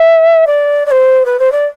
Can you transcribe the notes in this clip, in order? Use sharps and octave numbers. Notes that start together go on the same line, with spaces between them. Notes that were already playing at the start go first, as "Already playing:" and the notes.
Already playing: E5
D5
D5
C5
B4
C5
D5